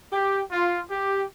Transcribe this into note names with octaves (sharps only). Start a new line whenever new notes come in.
G4
F4
G4